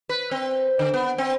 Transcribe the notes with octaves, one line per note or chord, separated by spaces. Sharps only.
B4
C4
D3
B3
C4